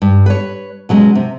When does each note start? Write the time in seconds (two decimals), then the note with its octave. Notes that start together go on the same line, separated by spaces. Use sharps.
0.02 G2
0.26 B4 C#5
0.89 B2 F#3 G#3 C#4
1.15 C3